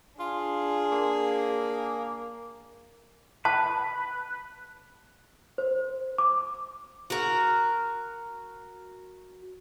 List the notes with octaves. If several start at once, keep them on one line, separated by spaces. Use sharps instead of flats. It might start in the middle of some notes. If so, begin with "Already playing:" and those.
D4 F4 G#4
A#3
B4 A5
C5
D6
F#4 A#4